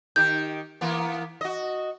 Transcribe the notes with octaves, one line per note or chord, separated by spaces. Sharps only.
D#3 G4 G6
E3 A#3 B3
F#4 D#5